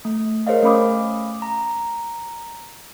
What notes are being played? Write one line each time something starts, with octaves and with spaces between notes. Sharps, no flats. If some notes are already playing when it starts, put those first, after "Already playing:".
A3
G#4 A#4 C5 C#5 D#5 F5
A3 C#4 F5 B5 D6 D#6
A#5